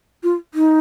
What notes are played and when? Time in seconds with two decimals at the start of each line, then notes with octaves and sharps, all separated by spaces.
0.23 F4
0.54 D#4